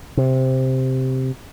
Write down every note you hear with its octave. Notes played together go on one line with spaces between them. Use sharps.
C3